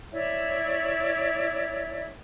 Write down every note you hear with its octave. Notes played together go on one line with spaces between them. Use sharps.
E4 C#5 D5 E5